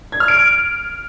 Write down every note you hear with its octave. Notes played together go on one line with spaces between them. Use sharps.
G#6
F6
D7